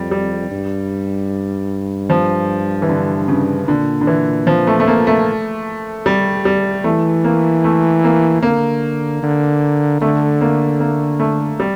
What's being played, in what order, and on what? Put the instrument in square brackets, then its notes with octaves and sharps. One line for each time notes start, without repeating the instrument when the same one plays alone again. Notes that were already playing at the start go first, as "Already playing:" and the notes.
Already playing: [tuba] F2 [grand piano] G3
[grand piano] G3
[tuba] G2
[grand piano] F3
E3
D3
C#3
[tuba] A#2 [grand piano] D3
[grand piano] D3
E3
F3
A3
A3
A#3
A3
G3
G3
[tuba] E3 [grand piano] A3
[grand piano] A#3
A3
A#3
[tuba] D3 [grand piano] A#3
[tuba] D3
[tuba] D3 [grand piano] A3
[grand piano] A#3
A#3
A3
G3